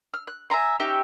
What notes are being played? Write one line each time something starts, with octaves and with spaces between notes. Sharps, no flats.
F6
F#6
E5 G#5 A#5 C6
C#4 D#4 G4 E5